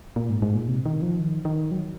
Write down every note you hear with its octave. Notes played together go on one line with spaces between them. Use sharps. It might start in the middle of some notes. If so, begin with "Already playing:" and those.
A#2
G#2
G#2
A#2
C3
D#3
F3
D#3
D#3
F#3